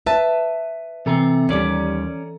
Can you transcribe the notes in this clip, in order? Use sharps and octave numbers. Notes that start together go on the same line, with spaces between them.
B4 E5 A5
C3 E3 C4 A4 A#5
D#2 G3 C#4 D5